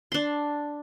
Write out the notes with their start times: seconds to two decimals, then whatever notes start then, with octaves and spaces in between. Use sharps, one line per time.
0.12 D4 C6